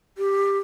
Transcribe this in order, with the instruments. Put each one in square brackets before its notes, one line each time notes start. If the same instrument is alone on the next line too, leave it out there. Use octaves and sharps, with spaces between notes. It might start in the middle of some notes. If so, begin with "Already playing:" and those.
[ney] G4